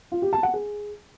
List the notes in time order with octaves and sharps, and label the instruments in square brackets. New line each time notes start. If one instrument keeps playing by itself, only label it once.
[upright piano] F4
G4
A5
F#5
G#4